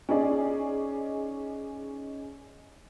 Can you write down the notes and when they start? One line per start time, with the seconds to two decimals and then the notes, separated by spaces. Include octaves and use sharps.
0.09 C#4 D#4 G#4 D5